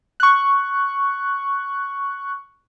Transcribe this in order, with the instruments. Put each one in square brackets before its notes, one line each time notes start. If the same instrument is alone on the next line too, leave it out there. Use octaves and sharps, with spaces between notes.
[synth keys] C#6 F#6